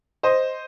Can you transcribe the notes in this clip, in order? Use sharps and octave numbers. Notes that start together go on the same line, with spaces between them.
C5 D#5